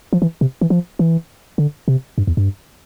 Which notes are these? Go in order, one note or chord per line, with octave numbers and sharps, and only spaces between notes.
F3
E3
C3
E3
F3
E3
D3
C3
G2
E2
G2